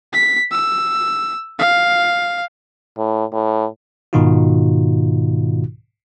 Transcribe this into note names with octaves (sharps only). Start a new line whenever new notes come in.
B6
E6
F5
A2
A2
G#2 B2 D#3 D#4 F4 F#4